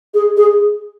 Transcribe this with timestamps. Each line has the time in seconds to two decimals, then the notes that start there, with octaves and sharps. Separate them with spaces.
0.14 G#4
0.37 G#4